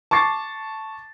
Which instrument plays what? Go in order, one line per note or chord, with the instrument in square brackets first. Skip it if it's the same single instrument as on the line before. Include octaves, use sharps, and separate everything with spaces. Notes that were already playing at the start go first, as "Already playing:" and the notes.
[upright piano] A5 C#6 D6 A6 C7